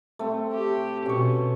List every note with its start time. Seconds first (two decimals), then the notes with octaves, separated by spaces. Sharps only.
0.19 A3 C4
0.53 G4
1.06 B2 C#4 C#6